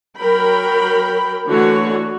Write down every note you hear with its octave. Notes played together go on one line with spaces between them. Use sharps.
F#3 A#4 G5 B5
D3 E3 A3 F#4 C#5